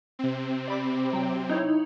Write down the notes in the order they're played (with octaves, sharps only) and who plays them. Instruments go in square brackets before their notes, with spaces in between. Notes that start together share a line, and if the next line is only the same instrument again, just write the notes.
[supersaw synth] C3 C4
[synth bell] D5 B5 D6
F#3 G5
D#4 E4 C#5